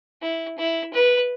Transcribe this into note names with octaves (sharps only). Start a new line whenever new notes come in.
E4
E4
B4